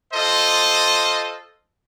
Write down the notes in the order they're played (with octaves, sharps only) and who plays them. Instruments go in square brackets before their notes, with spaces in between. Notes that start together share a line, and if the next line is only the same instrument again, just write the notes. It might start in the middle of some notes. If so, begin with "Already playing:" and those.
[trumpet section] F4 A4 C5 D#5